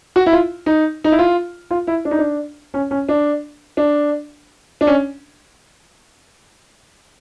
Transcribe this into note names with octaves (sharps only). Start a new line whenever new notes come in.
F#4
E4
F4
D#4
D#4
E4
F4
F4
E4
D4
D#4
D4
C#4
C#4
D4
D4
D4
C#4